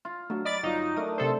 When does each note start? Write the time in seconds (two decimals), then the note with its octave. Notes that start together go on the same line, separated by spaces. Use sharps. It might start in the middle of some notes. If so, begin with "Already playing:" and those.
0.05 F4
0.30 F#3 A3 D4 F#4
0.45 D5 D#5 B5 A6 B6
0.63 G1 F#3 D#4 F4
0.96 A3 D4 A#4 D#6
1.18 C3 A4 C5